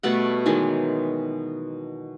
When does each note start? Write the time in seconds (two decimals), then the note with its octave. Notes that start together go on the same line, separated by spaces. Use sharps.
0.03 B2 G3 A3 F#5
0.46 D#3 E3 F#3 G#3